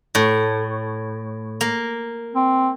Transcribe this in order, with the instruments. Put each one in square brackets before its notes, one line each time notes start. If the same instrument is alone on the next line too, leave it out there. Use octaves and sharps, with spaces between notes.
[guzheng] A2
A#3
[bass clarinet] C4